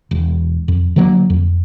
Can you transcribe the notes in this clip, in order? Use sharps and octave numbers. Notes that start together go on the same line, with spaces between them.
E1
F2
D3 F#3 G3 A#3
F2